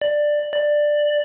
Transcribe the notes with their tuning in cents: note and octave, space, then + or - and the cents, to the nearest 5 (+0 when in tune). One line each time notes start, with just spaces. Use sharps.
D5 +10
D5 +10